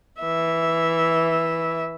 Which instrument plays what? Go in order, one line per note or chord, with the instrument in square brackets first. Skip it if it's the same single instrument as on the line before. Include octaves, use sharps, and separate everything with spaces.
[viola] E3 E5